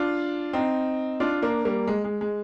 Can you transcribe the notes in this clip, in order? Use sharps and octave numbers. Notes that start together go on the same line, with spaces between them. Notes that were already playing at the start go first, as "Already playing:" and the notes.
Already playing: D4 F4
C4 D#4
D4 F4
A#3 D4
G3 A#3
G#3
G#3
G#3